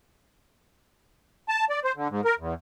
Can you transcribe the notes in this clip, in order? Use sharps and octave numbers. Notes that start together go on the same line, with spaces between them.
A5
D5
C5
D3
G#2
A#4
E2